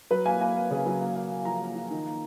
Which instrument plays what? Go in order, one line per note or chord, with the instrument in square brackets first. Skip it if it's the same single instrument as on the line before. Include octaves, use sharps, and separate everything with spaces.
[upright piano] F#3 B4
A#3 G#5
A#3 G#5
A#3
C#3
F#3
A#3
A#3
A#3
F3 A#5
A#3
F3
D#3
A#3